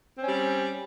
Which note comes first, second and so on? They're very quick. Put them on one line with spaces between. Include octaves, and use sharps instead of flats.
C4 C#4 G3